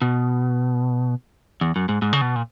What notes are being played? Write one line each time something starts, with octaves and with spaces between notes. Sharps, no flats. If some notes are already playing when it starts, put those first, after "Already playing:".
B2
E2
F#2
G#2
G#2
C#3
B2
A#2